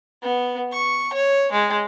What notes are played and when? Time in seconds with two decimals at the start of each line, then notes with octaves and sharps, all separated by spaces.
0.22 B3
0.72 C#6
1.13 C#5
1.52 G#3